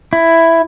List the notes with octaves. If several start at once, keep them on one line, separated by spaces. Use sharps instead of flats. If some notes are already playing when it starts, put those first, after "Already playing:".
E4